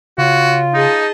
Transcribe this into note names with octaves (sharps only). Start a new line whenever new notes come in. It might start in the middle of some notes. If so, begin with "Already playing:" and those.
C#3 F4 F#4 C#5
D#4 G#4 D#5 A5